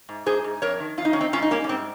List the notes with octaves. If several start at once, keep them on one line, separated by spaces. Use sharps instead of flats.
G#2
G#2 G#4 C5
G#2
F2 A#4 C#5
D#3
F2 F4
D#4
D#3 C#4
C4 D#4
G#2 C#4 F4
D#4
G3 A#3 C#4
C#4
G#2 C4